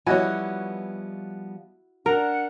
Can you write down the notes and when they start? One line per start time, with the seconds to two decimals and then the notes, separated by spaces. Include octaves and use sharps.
0.06 F3 G3 B3 E4 F#4 C#5 D#5 G#5
2.06 D4 A#4 F#5 A#5